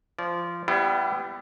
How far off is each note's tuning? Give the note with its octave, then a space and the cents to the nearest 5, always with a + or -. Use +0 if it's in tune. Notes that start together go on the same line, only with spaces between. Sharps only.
F3 -15 D5 -25
G3 +0 B3 +25 E4 +40